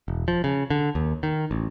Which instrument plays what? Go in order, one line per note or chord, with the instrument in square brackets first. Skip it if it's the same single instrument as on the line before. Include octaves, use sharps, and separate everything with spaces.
[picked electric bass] E1
F3
C#3
D3
D#2
D#3
A1